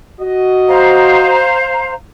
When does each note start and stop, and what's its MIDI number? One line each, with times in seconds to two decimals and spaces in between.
0.21 1.45 66
0.21 1.45 75
0.68 1.92 72
0.68 1.92 77
0.68 1.92 82